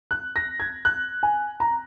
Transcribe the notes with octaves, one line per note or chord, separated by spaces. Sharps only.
F#6
A#6
G#6
F#6
G#5
A#5